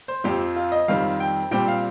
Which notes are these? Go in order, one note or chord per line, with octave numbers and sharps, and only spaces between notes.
C5
F2 F3 C4 G4
F4
D#5
F2 D#3 G3 C4 F5
G5
A#2 G3 C4 G5
F5